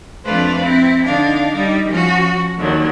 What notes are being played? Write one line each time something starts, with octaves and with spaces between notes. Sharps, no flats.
F2 A3 D4 B4 C5 F5
C4 E4
D3 D4 D#4 F5
G3 D#4
F3 C#4 F#4
D#2 D3 D#3 F#3